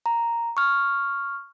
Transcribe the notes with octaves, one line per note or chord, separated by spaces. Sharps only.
A#5
C#6 F6